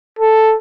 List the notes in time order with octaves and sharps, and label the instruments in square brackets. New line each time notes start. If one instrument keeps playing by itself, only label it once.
[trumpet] A4